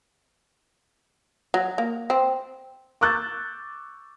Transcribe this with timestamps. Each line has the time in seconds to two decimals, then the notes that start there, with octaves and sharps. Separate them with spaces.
1.54 F#3
1.78 A#3
2.10 C4
3.01 C#6 D6 E6 F#6 G6 A6